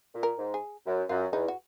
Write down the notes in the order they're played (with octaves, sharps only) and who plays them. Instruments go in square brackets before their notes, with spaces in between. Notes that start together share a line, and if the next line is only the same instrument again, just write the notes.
[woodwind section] A#2
[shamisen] A#4
[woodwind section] G#2
[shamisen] G#4
[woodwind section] F#2
[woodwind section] F#2 [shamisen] F4
[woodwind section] E2 [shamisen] D#4
[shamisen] F#4